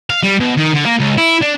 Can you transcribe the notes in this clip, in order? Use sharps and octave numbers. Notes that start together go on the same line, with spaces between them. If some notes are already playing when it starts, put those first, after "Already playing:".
F5
G3
B2
D#3
D3
A#3
C#2
E4
D4